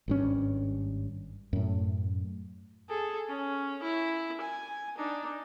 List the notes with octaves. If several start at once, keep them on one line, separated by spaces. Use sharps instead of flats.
G#1 G2 C#4
F#2 A2
G#4 A4
C#4
E4
G#5
D4 D#4